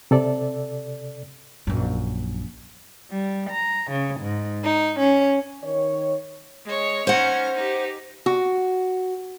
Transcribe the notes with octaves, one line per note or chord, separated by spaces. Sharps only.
C3 A4 D5
A#1 F#2
G3
A#5
C#3
G#2
D#4
C#4
D#3 C#5
G#3 C#5
C#4 D#4 C5 F#5 F6
D#4 G4
F#4